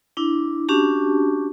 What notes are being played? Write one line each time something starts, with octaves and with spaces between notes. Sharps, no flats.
D4 E4
C#4 D4 F#4 G4 A5